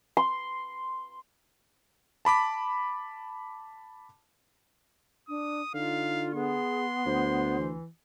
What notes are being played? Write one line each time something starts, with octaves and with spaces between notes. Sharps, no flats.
C6
A5 B5 D6 B6
D4 D#6
D3 D#4 F4 F5
B3 G#4 C6
D2 C5
E3